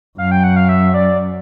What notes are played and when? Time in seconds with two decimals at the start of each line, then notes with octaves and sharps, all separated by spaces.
0.18 F#2 F5
0.31 G5
0.44 F#5
0.56 F5
0.69 E5
0.94 D5